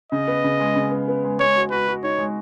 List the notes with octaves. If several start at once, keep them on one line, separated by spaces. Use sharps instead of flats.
C#3 D#5
B3
C#3
G#3
C#3
B3
B3
G#3
G#3 C#5
F#4
F#4 B4
F#4
D#4 C#5
G#3